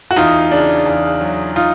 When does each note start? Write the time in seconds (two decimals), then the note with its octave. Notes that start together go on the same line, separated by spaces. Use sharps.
0.11 F#4
0.16 E2 D#4 F4
0.52 C#3 D4
0.86 E2
1.21 F#3
1.56 D#4 F4